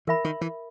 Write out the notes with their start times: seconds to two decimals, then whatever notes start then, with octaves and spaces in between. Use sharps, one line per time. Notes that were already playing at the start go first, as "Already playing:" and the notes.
0.07 E3 A#4 E5 B5
0.25 D#3
0.41 E3